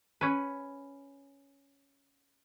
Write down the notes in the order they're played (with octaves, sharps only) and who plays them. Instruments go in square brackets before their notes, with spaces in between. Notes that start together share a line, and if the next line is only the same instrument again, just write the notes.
[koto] C#4 B4